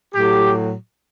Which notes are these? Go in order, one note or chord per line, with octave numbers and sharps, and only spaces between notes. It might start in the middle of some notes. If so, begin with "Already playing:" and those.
A2 F#3 G4